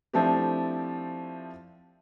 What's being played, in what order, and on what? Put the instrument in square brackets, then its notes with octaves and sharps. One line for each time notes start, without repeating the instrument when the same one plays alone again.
[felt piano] F3 A3 C4 D4 E4 G4